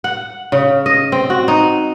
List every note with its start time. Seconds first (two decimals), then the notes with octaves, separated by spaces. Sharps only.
0.04 F#5
0.52 C#3
0.86 D#5
1.12 C4
1.30 F#4
1.48 D#4